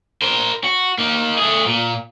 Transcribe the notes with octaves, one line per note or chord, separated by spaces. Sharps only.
A#4 C5
F#4
A#3 D#4
A3 G#4
A#2